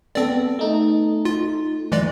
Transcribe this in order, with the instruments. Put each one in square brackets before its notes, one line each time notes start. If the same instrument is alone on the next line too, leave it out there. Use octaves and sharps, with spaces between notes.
[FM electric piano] B3 A4 [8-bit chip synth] C4 D5
[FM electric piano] A3 D#4
[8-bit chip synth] F4
E3 G#3 D5